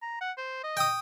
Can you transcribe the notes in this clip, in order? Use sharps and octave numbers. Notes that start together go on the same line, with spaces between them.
A#5
F#5
C5
D#5
G5 D#6